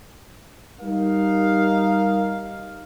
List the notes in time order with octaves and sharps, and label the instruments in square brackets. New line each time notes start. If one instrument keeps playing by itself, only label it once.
[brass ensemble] G3 D#4 A#4 F5